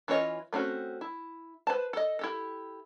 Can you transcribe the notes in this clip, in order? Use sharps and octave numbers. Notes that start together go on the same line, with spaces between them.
E3 C#4 F4 C#5 D#5
A3 C4 C#4 F#4
E4
B4 C5 A5
A4 D#5
E4 G4 A4